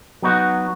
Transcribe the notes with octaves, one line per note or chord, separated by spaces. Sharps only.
F#3 B3 D#4 F#4